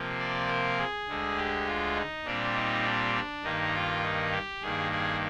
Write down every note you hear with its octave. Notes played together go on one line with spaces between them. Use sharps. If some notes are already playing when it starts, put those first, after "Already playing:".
Already playing: C3 F3 A#3
D5
A#4
G#4
D2 D3 G#3
G4
F4
D#4
A#2 G3 C4 D4
D#4
D4
D4
G2 D#3 A#3 D#4
F4
D#4
G4
G2 D#3 A#3 G#4
G#4